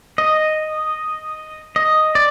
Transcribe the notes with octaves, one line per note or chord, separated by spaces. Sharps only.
D#5
D#5
D5